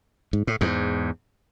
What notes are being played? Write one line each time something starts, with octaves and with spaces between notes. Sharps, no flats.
G#2
A2
E2 G#2